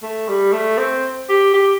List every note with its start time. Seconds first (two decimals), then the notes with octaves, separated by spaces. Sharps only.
0.03 A3
0.29 G3
0.53 A3
0.78 C4
1.29 G4
1.54 G4